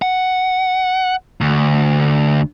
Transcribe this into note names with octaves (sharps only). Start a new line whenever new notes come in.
F#5
D2